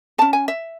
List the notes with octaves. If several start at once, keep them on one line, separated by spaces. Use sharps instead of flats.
C#4 G#4 A5
G#5
E5